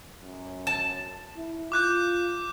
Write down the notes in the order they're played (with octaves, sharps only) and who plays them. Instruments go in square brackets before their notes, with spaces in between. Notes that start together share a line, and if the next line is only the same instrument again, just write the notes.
[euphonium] F#2
[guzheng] A5
[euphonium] E4
[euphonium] F4 [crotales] D6 F#6 G6